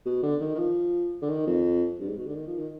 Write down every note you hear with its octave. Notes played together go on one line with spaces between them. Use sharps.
B2
D3
D#3
D#3
F3
D3
D#3
F2
G2
G#2
B2
D3
D#3
F3
D#3